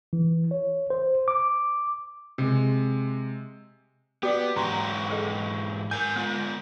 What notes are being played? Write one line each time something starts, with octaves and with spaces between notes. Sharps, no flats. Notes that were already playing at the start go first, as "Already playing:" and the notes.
E3
C#5
C5
D6
C3 G#3
B3 F#4 G4 D5
G#2 E3 F#4 G4 A#5 C6
G#4 A4 D#5
A#4 G#5 G6
G#3 B3 F4